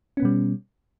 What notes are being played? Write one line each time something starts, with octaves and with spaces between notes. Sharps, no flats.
B2 G3 B3 C#4